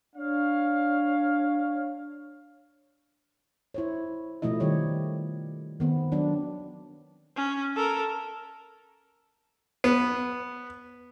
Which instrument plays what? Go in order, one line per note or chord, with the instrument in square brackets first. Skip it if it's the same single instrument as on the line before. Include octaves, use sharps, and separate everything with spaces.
[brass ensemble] D4 C#5 F5
[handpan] E4 C5 C#5
B2 F3 A3 E4 D#5
D#3 G3 G4 C#5
D#3 B3 C4
F#3 D4
[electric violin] C#4
A4 A#4
[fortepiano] B3